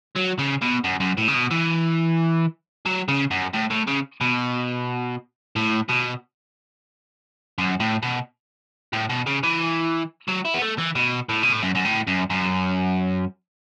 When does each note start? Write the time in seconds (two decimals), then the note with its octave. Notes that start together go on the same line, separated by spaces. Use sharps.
0.16 F#3
0.39 C#3
0.61 B2
0.84 F#2
1.00 F#2
1.17 A2
1.28 C#3
1.34 B2
1.51 E3
2.85 F#3
3.08 C#3
3.31 F#2
3.53 A2
3.70 A2
3.87 C#3
4.21 B2
5.56 A2
5.89 B2
7.58 F#2
7.80 A2
8.02 B2
8.93 A2
9.10 B2
9.27 C#3
9.43 E3
10.28 F#3
10.45 E4
10.54 B3
10.62 A3
10.78 E3
10.95 B2
11.29 A2
11.43 B2
11.52 A2
11.63 F#2
11.75 F#2
11.85 A2
12.07 F#2
12.30 F#2